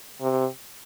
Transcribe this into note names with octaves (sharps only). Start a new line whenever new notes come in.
C3